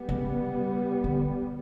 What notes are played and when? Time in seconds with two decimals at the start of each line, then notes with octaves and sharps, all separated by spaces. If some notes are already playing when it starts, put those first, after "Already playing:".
Already playing: G3 B3
0.09 C#3
1.04 D3